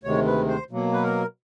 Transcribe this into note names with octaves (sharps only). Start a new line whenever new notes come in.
D2 C3 D#3 G#3 C#5
B4
C5
B2 F#3 A#3
B4
A#4